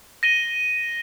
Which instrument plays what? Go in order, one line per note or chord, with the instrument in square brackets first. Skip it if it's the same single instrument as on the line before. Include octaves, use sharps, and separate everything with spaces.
[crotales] A#6 D#7 G7